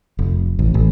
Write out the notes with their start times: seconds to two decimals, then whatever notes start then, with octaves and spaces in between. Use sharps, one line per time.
0.19 F1
0.59 A1
0.74 A1